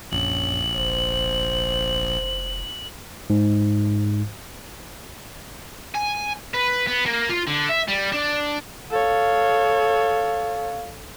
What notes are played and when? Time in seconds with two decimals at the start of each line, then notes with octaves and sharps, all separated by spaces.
0.12 A#1 F#2 C#4 F#7
0.76 F1 C5
3.30 G#2
5.95 G#5
6.54 B4
6.88 B3
7.06 A#3
7.29 F4
7.47 D3
7.69 E5
7.88 G3
8.12 D4
8.91 A4 C#5 F5